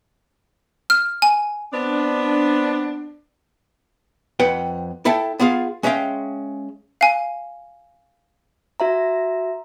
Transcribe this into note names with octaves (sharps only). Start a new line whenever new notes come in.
F6
G#5
B3 C4 D4
F2 B4 F#5 G5
E4 A4 E5 G5 A5
B3 F4 G#4 F5
G#3 C#4 E5 F5 G5
F5 G#5
F#4 E5 A#5